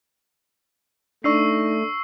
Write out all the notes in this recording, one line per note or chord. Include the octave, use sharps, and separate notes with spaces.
A3 D4 D#4 D5 C#6 E6 C7